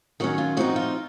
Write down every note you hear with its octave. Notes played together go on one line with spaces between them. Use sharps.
D#3 F#3 C#4 F#4
F4
F3 C4 D#4 F#4
F4